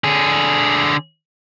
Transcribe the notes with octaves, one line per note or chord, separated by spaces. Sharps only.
D3 G#4